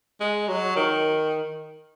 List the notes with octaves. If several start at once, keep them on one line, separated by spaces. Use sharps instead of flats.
G#3
F#3
D#3